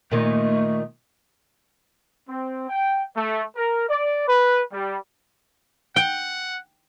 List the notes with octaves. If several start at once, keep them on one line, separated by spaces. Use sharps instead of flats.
A#2 D#3 A3
C4
G5
A3
A#4
D5
B4
G3
F#5 G5